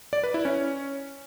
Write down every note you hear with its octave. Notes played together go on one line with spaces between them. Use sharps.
D5
B4
E4
C#4